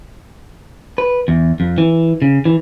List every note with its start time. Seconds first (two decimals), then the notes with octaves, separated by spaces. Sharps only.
0.98 B4
1.28 E2
1.60 F2
1.78 E3
2.22 C#3
2.45 E3